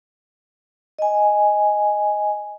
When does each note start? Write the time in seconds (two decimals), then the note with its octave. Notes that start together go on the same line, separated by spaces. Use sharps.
0.99 D#5 G#5